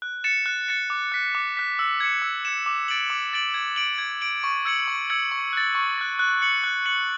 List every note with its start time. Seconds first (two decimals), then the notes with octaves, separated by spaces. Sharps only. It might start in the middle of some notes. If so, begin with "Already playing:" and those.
0.02 F#6
0.24 A6 C#7 E7
0.46 F#6
0.68 A6 C#7 E7
0.90 D6
1.12 F#6 B6
1.35 D6
1.57 F#6 B6
1.79 E6
2.00 G#6 C#7 E7
2.22 E6
2.45 G#6 C#7 E7
2.66 D6
2.88 A6 D7 F#7
3.10 D6
3.33 A6 D7 F#7
3.54 G#6
3.76 D7 F#7
3.98 G#6
4.21 D7 F#7
4.44 C#6
4.65 E6 G#6 C#7 F#7
4.88 C#6
5.10 E6 G#6 C#7 F#7
5.32 C#6
5.53 F#6 A6
5.75 C#6
5.98 F#6 A6
6.19 F#6
6.42 C#7 F#7
6.64 F#6
6.86 C#7 F#7